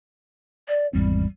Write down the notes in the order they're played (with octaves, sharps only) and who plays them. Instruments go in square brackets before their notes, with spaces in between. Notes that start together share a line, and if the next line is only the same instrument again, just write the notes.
[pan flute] D5
[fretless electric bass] G#1 E2 C4 [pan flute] G3